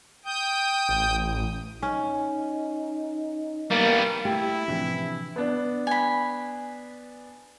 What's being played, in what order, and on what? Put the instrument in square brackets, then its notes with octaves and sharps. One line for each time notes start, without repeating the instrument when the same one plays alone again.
[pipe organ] G5 D#6 G6
[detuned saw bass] A1
[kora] C#4 [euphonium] D#4
[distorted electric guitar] G3 B3 [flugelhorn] A#3
[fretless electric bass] A3 [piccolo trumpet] E4 [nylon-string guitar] G4
[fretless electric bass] A2 F3 [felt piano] C3 E3 D4
[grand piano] B3 D4
[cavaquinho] G#5 B5